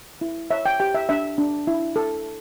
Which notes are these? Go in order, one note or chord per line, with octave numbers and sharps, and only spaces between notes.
E4
C#5 E5
G5
G4 G5
E5
D4 E5
D4
E4
A4